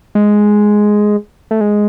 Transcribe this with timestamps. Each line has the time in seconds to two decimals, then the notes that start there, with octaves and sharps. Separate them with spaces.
0.15 G#3
1.51 A3
1.61 G#3